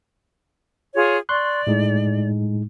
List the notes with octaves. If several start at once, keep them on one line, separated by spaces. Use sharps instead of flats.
F4 G#4 C#5
D5 C6 C#6 F#6
A2 G#3 D#4